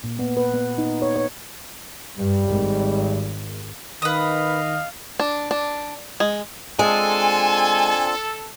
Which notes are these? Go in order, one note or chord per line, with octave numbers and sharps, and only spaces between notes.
A#2
B3
B4
B3
D#4
C#5
C#5
G2 G3
G#1
D#3 B4 D#5 F5 D#6
D4
D4
G#3
G#3 C4 D4 F4 A4 G#5